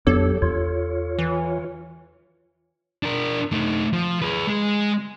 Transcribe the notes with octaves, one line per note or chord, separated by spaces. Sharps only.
F2 F#3 B3 D4 G4 A4 C#5
E2 F4 C#5
E3
D4 A#4
A3 D#4
F3
G#4 B4
G#3